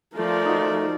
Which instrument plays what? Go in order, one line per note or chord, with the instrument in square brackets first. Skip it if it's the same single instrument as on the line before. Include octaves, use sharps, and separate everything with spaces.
[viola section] F3 [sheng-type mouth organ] A3 [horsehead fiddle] A#4 D5
[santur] D#4 F#4